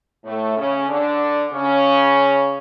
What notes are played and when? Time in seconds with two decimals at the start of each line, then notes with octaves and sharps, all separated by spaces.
0.25 A2 A3
0.57 C#3 C#4
0.89 D3 D4
1.53 C#3 C#4